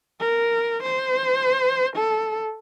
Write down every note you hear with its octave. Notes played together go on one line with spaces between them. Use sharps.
A#4
C5
A4